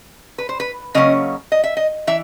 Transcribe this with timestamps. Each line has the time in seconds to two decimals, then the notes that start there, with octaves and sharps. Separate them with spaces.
0.38 B4
0.49 C5
0.60 B4
0.95 C#3 F#3 A#3 C#4 D#5
1.52 D#5
1.64 E5
1.77 D#5
2.07 E3 E5